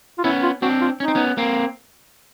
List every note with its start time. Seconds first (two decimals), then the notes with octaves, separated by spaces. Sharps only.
0.18 F4
0.24 B3 C#4 E4
0.43 F4
0.62 C4 D4 F#4
0.81 F4
1.00 C#4 D#4
1.08 C4
1.15 B3 C#4
1.38 A#3 C4